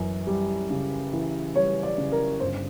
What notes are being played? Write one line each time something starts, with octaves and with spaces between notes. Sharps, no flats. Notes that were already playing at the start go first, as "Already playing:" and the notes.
Already playing: F#2 E3
G3
C#3
E3
G3 C#5
D5
C#3
A#4
G1 C5